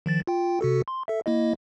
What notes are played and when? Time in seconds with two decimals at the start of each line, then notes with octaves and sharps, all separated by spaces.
0.06 D#3 F3 A6
0.27 F4 G5
0.61 C3 F#4 A4
0.88 C6
1.08 A4 E5
1.26 A#3 E4 D#5